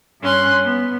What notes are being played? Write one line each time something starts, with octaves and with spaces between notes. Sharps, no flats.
G2 C#4 C6 F#6
B3